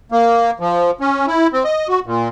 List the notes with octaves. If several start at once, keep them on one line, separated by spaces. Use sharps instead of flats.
A#3
F3
C#4
E4
C4
D#5
F#4
A#2